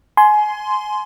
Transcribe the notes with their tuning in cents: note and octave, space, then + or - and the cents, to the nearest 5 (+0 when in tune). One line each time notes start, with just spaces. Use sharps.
G#5 +25 C6 -5